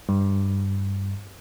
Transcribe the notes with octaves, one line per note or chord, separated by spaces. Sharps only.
G2